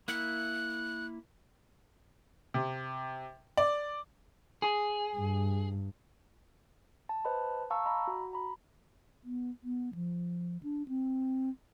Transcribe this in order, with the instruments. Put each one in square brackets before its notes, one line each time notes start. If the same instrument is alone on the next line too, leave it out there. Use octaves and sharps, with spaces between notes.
[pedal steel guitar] A#3 E4 E5 [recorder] F#6
[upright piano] C3
D5
[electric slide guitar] G#4
[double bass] G2
[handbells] A5
B4 C5 D#5 A5 B5
F5 A5 A#5 C#6 E6
D#5 A#5 B5
F#4
A#5 B5
[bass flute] B3
B3
F3
D4
C4